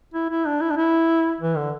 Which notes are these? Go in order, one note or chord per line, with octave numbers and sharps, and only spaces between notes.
E4
E4
D4
E4
D4
E4
E3
D3